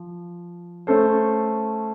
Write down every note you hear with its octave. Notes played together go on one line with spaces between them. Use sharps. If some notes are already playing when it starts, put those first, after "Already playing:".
Already playing: F3
A3 C#4 A4 C5